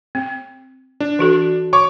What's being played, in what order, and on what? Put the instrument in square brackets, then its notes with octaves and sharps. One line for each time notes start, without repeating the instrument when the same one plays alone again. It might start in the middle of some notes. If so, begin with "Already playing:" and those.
[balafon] C4
[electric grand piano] D4
[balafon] E3 F#4 A4
[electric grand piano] C#5 C#6 D6